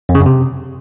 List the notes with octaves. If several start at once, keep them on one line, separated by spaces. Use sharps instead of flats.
F2
C#3
F#2
C3